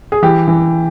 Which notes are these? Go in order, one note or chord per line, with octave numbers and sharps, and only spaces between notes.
G#4
E3 G4
E3